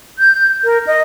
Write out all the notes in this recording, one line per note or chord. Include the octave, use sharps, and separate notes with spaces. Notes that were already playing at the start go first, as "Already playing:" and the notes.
G6
A#4
D#5